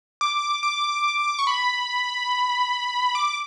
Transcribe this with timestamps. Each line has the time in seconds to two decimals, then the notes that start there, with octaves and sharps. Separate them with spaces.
0.21 D6
0.63 D6
1.39 C#6
1.47 B5
3.15 D6